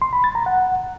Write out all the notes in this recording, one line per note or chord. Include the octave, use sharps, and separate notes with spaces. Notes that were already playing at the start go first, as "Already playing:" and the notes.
C6
B5
A6
A#5
F#5